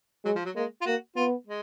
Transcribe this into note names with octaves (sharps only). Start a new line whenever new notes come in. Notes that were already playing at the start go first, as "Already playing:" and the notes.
F#3 G#3
F3
F#3
G#3 A#3
F4
A#3 F#4
B3 F4
G#3